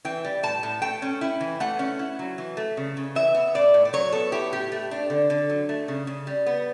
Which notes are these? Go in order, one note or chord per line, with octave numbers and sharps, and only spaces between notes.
E3 G5
G3
A2 A5
A2
A3 G5
C#4
E4
E3
A3 F#5
C#4
E4
F#3
E3
A3
C#3
C#3
E3 E5
B3
A2 D5
A2
D5
F#3 C#5
B3 A4
E4 G4
A2 G4
A3
D4
D3
D3
F#3
A3
C#3
C#3
G3
B3